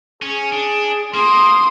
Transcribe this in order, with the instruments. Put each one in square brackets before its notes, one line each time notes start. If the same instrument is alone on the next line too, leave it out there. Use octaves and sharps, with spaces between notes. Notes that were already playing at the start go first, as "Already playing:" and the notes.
[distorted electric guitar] C#4 [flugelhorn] G#4
[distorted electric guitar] D4
[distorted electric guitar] A#3 [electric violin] C6 D#6